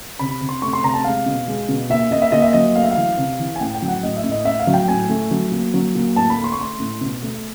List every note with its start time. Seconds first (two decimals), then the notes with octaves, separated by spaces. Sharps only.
0.19 C3 B5
0.41 C3
0.49 C6
0.62 A3 C#6
0.73 C6
0.83 C3 A#5
0.94 A5
1.04 G#3 F5
1.26 B2
1.48 G#3
1.69 B2
1.90 A#2 E5
2.11 A#2 D#5
2.22 E5
2.32 A#2 D#5
2.42 E5
2.53 F#3 D#5
2.76 A3 F5
2.84 E5
2.91 F5
2.97 E3
3.17 C3
3.39 E3
3.56 G#5
3.61 A2 G5
3.74 G5
3.82 F#3
3.88 F#5
4.03 A2 D#5
4.17 E5
4.24 A2
4.32 D#5
4.45 A2 E5
4.59 F5
4.67 F#3
4.74 G5
4.88 A2 G#5
5.09 A3
5.31 F#3
5.51 A#2
5.74 F#3
5.95 A#2
6.16 A2 A5
6.30 B5
6.37 A3
6.44 C6
6.52 C#6
6.59 A3 C6
6.80 A2
7.01 B2
7.22 A3